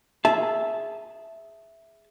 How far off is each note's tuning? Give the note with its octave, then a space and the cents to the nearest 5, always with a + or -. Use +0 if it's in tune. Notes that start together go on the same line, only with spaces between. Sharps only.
G#4 +0 E5 +0 A5 -15